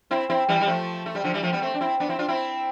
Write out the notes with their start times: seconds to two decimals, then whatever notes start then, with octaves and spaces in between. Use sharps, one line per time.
0.11 C4 E4
0.30 C4 E4
0.48 E3 G3
0.61 G3
0.67 F3 A3
1.06 A3
1.15 G3
1.24 D3 F3
1.34 E3 G3
1.43 F3 A3
1.53 G3 B3
1.62 A3 C4
1.74 D4
1.81 C4 E4
2.00 B3 D4
2.09 C4 E4
2.19 D4 F4
2.28 C4 E4